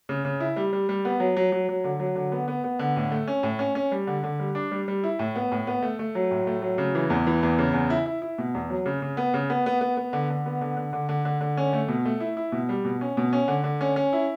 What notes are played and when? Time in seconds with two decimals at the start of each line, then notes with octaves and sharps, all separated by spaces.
0.09 C#3
0.25 C#3
0.40 E4
0.56 G3
0.73 G3
0.89 G3
1.05 B3
1.20 F#3
1.37 F#3
1.52 F#3
1.69 F#3
1.84 D3
2.00 F#3
2.16 D3
2.32 B3
2.48 B3
2.64 B3
2.79 D3
2.96 A2
3.12 A3
3.28 C#4
3.43 A2
3.59 C#4
3.75 C#4
3.92 G3
4.07 D3
4.24 D3
4.40 G3
4.55 D4
4.72 G3
4.88 G3
5.04 E4
5.19 A2
5.36 B3
5.52 A2
5.67 B3
5.82 A3
5.99 A3
6.15 F#3
6.31 A2
6.47 A3
6.62 F#3
6.78 C#3
6.95 E3
7.10 E2
7.27 E3
7.43 E2
7.59 C#3
7.74 E2
7.90 E4
8.06 E4
8.22 E4
8.38 B2
8.55 E2
8.70 F#3
8.86 C#3
9.02 C#3
9.17 B3
9.34 C#3
9.50 B3
9.66 B3
9.81 B3
9.97 B3
10.13 D3
10.30 D3
10.46 B3
10.61 D3
10.77 D3
10.93 D3
11.09 D3
11.25 D3
11.41 D3
11.57 C#4
11.73 A3
11.88 B2
12.05 A3
12.20 E4
12.37 E4
12.52 B2
12.69 G3
12.85 B2
13.01 C#4
13.17 B2
13.33 C#4
13.48 D3
13.64 D3
13.81 C#4
13.96 C#4
14.13 E4